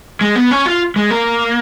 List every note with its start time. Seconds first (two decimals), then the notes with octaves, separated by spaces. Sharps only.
0.21 G#3
0.36 B3
0.51 C#4
0.66 F4
0.96 G#3
1.11 A#3